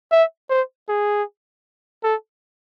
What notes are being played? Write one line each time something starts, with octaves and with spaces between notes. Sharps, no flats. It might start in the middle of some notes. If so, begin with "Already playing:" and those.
E5
C5
G#4
A4